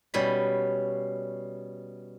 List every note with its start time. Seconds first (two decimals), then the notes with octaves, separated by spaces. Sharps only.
0.14 B2 G3 C#4 B5